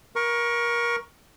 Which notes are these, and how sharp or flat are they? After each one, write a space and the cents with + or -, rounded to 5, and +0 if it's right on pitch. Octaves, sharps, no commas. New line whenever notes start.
A#4 +25 C#6 +0